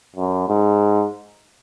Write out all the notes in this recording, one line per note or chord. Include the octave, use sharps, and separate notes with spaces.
F#2
G#2